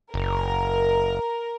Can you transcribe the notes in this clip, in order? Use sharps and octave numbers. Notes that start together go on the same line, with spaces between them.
F#1 A#4